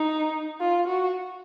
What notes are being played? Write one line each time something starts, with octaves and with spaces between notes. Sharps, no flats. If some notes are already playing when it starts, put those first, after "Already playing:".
Already playing: D#4
F4
F#4